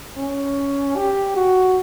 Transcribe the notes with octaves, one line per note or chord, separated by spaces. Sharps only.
C#4
G4
F#4